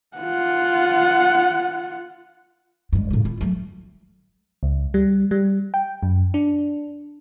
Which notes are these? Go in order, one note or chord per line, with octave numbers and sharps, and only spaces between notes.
F4 F#5
G2 G#3
A2 C#3
E4 F4
F#3 A3
C#2
G3
G3
G5
F#2
D4